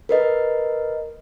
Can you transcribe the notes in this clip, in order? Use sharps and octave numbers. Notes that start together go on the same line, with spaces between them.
A#4 B4 D#5